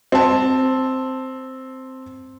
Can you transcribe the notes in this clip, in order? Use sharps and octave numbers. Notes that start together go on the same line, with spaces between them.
C4 A5